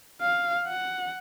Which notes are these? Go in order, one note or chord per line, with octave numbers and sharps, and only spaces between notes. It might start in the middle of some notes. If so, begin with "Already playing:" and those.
F5
F#5